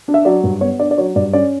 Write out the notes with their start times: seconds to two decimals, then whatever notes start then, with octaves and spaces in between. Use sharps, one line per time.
0.08 D4
0.14 E5
0.25 F#3 D5
0.44 G2
0.61 B3 C#5
0.80 D4 D5
0.91 D5
0.98 F#3 C#5
1.16 G2 D5
1.33 C#4 D5